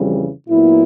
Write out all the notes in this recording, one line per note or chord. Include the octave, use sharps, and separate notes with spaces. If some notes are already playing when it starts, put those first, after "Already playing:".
Already playing: F2 C#3 E3 G3
A#2 F#3 B3 E4